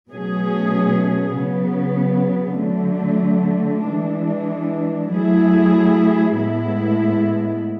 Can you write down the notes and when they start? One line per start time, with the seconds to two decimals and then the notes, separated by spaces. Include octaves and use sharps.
0.12 B2 F#3 A3 C#4 G#4
1.37 C#3 F#3 B3
2.62 D3 F#3 A3
3.87 E3 G#3 D4
5.12 F#3 A3 E4 G#4
6.37 A2 G#3 B3 E4